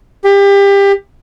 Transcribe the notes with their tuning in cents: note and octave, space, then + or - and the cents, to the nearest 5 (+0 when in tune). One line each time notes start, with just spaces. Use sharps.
G4 +25